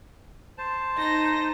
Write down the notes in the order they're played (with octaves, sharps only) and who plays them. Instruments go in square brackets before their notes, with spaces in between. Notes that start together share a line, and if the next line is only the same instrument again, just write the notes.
[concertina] C5 A5
[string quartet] D#4 A#6